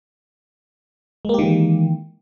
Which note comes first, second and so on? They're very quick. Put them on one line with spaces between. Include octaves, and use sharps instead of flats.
G#3 A#3 G4 D#3 E3